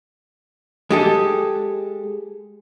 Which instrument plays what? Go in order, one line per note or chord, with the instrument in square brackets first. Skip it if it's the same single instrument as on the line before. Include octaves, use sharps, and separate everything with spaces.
[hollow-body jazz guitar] G#3 G4 A4